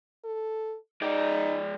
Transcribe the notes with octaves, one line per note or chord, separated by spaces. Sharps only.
A4
G#3 D#4 D5